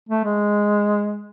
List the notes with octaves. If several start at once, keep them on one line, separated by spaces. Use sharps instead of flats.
A3
G#3